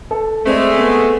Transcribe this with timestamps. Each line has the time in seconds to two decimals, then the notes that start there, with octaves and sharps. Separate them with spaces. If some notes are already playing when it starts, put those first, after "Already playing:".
0.11 A4
0.46 G#3 A3 C4 C5 D5
0.78 B3